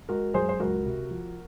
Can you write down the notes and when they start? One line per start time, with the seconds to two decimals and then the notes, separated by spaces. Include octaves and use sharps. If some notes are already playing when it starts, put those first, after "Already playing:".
0.09 G#3 F#4 A#4
0.34 F#2 G#4 C5
0.49 C5
0.60 C#2 F#4 A#4
0.85 C3
1.10 F3